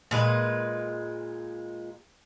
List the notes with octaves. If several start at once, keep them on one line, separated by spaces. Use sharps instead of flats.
A#2 G#3 B4